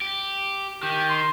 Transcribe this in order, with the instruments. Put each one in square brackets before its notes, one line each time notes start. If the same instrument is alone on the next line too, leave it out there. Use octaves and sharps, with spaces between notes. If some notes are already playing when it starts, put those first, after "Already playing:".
[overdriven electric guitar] G4
[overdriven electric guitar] D#3 [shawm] G4
[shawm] C6